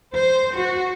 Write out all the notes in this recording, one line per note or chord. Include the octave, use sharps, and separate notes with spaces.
C5
F#4